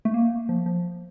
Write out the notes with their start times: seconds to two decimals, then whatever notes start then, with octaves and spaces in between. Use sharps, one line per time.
0.05 A3
0.14 A#3
0.49 F3
0.66 F3